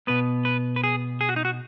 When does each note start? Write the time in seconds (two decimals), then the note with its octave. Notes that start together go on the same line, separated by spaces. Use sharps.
0.07 B2 B3 B4
0.45 B4
0.76 B4
0.84 G#4
1.21 G#4
1.29 F#4
1.36 D#4
1.45 F#4